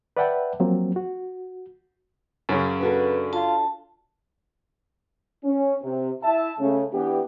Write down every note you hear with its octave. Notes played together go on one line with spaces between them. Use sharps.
B4 D5 E5 F#5 G5 A5
F3 F#3 A#3 C4
F#4
F#2 C#3
D4 F#4 A4 B4
F4 A5
C#4
C3
E4 E5 A5
C#3 A3 C#4
E3 B3 D4 G4